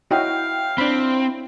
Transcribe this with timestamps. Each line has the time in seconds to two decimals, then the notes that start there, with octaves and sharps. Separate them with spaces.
0.11 E4 F#4 C#5 D#5 F5 G5
0.78 C4 D4 B5